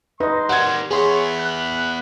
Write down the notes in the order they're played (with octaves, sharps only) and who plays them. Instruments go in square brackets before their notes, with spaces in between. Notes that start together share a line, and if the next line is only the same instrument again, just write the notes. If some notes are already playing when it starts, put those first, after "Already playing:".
[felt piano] D#4 [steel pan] B4 D#5 [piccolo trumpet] C6
[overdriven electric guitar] D#3 G3 [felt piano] F#5 G#6
[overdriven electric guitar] B3 E4 [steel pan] G#4 C6 [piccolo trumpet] C#5
[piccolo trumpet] F#6